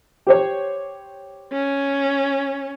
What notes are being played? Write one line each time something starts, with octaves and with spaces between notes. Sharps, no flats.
G4 C5 C#5
C#4